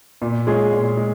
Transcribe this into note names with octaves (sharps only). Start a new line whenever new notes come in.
A#2
G#3 C#4 F4 G#4
A#2
G#3